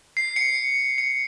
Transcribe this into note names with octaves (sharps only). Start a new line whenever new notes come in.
C7
C#7
C#7